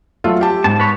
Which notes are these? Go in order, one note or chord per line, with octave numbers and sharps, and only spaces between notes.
F#3 A3 F4
G4 A5
G#2 A5
B4 C#5